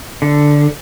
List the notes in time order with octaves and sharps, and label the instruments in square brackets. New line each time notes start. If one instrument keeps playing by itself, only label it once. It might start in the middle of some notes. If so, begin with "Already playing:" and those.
[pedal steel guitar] D3